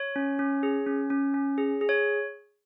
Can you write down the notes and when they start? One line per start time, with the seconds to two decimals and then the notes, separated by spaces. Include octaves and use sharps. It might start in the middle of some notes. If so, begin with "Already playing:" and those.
Already playing: C#5
0.16 C#4
0.39 C#4
0.63 G#4
0.87 C#4
1.10 C#4
1.34 C#4
1.58 G#4
1.81 G#4
1.89 C#5